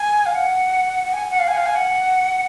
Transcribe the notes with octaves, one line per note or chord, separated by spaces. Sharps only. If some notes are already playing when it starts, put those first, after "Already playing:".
Already playing: G#5
F5
F#5
F#5
G#5
F#5
F5
G#5
F5
G#5
F#5